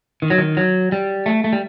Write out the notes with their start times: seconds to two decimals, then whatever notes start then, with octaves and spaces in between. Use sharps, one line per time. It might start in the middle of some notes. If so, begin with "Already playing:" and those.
0.22 D#3
0.30 F#3
0.38 D#3
0.57 F#3
0.92 G3
1.26 A3
1.44 A3
1.53 G3